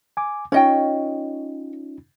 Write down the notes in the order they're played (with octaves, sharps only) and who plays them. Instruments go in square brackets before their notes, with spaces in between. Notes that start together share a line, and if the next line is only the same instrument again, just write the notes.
[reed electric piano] G#5 D6
[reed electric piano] C#4 D#4 F4 [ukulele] C#5 D#5 G5